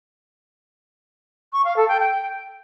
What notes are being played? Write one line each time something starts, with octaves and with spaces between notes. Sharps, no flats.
C#6
F5
A4
G5
G5